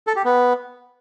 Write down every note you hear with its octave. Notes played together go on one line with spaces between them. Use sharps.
A4
G4
B3